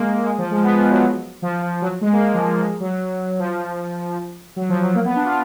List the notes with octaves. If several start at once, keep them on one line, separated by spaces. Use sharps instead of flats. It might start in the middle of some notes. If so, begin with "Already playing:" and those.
Already playing: G#3 A#3
G#3
F3
G#3
B3
F3
F#3
F3
F3
F#3
G#3
A#3
G#3
F3
A#3
G#3
F#3
F3
F#3
F3
F#3
A#3
B3
D4
F4